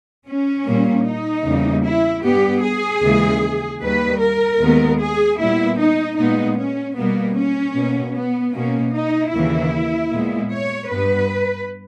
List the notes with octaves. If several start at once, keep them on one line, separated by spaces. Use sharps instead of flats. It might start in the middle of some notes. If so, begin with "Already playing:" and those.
C#4
A#2 G3 A#3
D#4
E2 C#3 G3 A#3
E4
G2 G3 B3 G4
G#4
D#2 C#3 E3 G#3
D#2 D#3 G3 A#3 B4
A#4
D#2 D#3 G#3 B3
G#4
A#2 G3 B3 E4
D#4
A#2 G#3 B3 D#4
C#4
B2 G3 A#3 B3
C#4
B2 A#3
B3
B2 A#3 C#4
D#4
D#2 C#3 E3 A#3 E4
A#2 G#3 B3
C#5
G2 G3 B3 B4